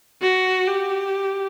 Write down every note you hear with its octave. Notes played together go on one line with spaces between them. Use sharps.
F#4
G4